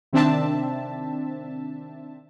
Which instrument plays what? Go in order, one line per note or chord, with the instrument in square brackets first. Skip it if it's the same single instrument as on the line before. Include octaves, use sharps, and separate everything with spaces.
[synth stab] C3 D#3 C4 D4 E5 A5